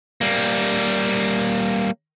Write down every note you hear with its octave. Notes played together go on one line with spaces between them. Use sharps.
G3 A#3